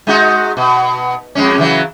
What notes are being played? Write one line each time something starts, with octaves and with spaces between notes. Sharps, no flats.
G#3 D#4 F#4
B2
F2 G#3 C#4
C#3 E3 F#3